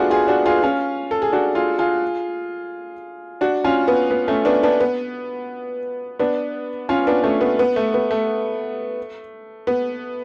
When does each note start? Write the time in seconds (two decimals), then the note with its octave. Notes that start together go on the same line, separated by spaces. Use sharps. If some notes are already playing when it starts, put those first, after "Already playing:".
Already playing: A3 B3 D4 F4 F#4 G#4
0.10 F4 G#4
0.28 D4 F#4
0.46 F4 G#4
0.63 C#4 F4
1.11 A4
1.22 G#4
1.33 D4 F#4
1.55 F4 G#4
1.78 F4 G#4
3.41 D4 F#4
3.64 C#4 F4
3.88 B3
4.10 B3
4.28 A3 C#4
4.45 B3 D4
4.63 B3 D4
4.80 B3
6.19 B3 D4
6.89 C#4 F4
7.07 B3 D4
7.24 A3 C#4
7.41 B3
7.59 B3
7.76 A3
7.94 B3
8.11 A3
9.67 B3